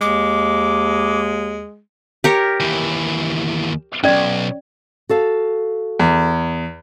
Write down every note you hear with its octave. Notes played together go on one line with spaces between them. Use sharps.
D#2 G#3 D6
G4 A#4 C#5
D#2 E3
B1 G2 C#4 D5
F#4 A4 F5
E2